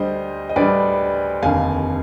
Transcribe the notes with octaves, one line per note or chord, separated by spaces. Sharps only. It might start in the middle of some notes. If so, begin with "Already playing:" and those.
Already playing: D2 D3 G3 C5 D#5
D#5
D2 D3 G3 B4 D5
F1 D#2 D3 F5 G#5